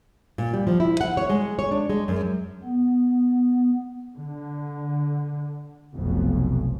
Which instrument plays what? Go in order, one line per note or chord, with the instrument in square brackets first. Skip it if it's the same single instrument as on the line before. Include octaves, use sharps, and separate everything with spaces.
[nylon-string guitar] A#2
G3
F3
E4
F#5
C#5
G#3
C#5
D4
G#3
F#2
[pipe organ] B3
[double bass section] D3
F1 B1 F2